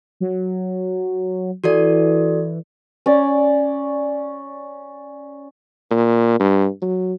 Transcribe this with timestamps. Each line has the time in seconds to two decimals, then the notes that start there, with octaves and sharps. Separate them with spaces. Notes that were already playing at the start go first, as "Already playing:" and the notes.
0.20 F#3
1.64 E3 F#4 A4 D5
3.06 C#4 D5
5.91 A#2
6.40 G2
6.82 F#3